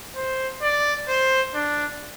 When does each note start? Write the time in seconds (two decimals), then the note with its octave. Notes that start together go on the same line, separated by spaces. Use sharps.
0.16 C5
0.62 D5
1.09 C5
1.55 D4